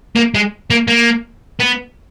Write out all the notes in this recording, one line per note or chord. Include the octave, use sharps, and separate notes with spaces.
A#3
G#3
A#3
A#3
B3